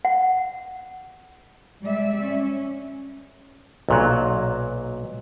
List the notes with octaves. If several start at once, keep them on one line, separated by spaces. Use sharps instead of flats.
F#5
G3 G#3 D5 E5
C#4
B1 A#2 F#3